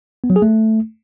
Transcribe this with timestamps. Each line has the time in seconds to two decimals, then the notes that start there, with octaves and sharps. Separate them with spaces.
0.24 B3
0.30 F#3
0.36 G#4
0.42 A3